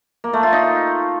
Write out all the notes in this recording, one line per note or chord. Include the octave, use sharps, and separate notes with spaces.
A#3
A3
F4
D#4